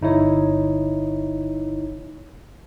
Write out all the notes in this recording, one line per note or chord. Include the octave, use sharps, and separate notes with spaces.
G1 D#4 E4 C#5